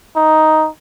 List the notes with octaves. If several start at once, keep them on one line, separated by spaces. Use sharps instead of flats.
D#4